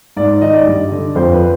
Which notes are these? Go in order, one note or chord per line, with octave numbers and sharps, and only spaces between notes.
G#2 D5
D#3 D#5
D5
G2
D3
F2 C5
B4